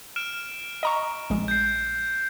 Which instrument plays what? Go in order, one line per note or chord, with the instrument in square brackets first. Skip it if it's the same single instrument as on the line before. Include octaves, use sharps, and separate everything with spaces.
[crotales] F6 D7 E7
[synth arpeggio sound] D#5 A#5 C#6
A#1 G#3
[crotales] G6 C7